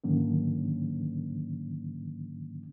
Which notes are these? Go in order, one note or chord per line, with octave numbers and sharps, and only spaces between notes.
G#2 D3 D#3 F#3 A#3 C#4